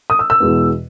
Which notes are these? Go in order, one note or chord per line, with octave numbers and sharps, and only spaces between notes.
D#6
E6
E6
E2 B2 G#3 B3